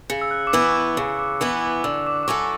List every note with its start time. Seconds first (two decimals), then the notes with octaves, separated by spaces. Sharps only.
0.10 C#3 C#7
0.21 E6
0.31 F#6
0.47 D6
0.53 E3 B3 E4 E6
0.69 C#6
0.75 D6
0.97 C#3 C#6
1.19 D6
1.40 E3 B3 E4 D6
1.62 D6
1.84 D3 E6
2.06 D6
2.23 D6
2.28 F#3 C#4 E4 A4 C#6